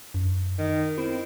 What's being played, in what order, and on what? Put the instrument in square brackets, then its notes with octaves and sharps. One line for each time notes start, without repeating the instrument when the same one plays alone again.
[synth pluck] F#2
[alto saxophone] D#3
[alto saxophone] C4 [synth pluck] E4